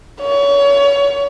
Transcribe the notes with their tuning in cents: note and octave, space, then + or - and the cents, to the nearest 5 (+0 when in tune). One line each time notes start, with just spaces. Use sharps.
C#5 +30